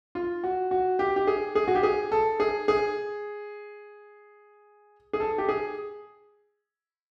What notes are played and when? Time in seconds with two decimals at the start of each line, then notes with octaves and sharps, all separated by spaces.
0.15 F4
0.44 F#4
0.71 F#4
0.99 G4
1.16 G4
1.27 G#4
1.55 G#4
1.68 F#4
1.75 G4
1.83 G#4
2.12 A4
2.40 G#4
2.68 G#4
5.13 G#4
5.20 A4
5.38 G4
5.49 G#4